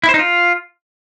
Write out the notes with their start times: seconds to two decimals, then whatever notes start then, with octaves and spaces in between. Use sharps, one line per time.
0.04 E4
0.09 C5
0.14 D#4
0.19 F4